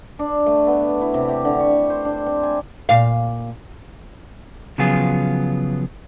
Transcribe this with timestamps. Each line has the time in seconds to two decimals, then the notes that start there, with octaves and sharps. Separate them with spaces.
0.19 D4
0.46 A3
0.67 B3
1.01 E4
1.14 C3
1.29 G4
1.44 D3
1.59 C#6
1.90 C5
2.05 D4
2.26 C4
2.43 G#5
2.89 A#2 F5
4.78 C#3 F3 F#3 B3 F4 G#4